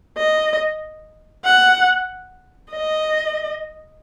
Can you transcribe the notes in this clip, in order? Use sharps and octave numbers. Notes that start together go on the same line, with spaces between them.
D#5
F#5
D#5